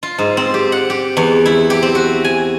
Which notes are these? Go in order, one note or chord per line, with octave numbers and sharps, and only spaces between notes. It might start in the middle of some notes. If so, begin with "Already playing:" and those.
F4
G#2
C4
G4
F#5
G4
E2
E4
G4
C4
F#4
G#5